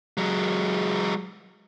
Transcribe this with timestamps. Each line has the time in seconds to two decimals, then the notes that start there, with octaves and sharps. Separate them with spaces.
0.17 F#3 G#3